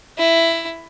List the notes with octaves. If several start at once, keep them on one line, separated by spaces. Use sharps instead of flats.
E4